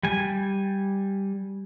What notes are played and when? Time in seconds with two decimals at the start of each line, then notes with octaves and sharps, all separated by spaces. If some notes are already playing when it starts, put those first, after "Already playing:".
0.03 G3 G#5